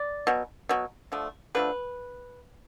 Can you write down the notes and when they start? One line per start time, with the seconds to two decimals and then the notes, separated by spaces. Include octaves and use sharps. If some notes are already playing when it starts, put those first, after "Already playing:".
Already playing: D5
0.27 B2 F#3
0.69 B2 F#3
1.12 D3 F3 A3
1.55 D3 F3 A3 B4